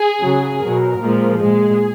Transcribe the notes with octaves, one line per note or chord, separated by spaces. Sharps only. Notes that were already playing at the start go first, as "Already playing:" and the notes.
Already playing: G#4
C#3 F#3
B2 F#3 A#4
A#2 F3 G#3
A#2 G#3 G#4